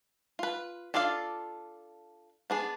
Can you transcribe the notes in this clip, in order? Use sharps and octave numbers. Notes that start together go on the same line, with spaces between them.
F4 B4
D4 F4 A4 D5 F5
B3 D4 G#4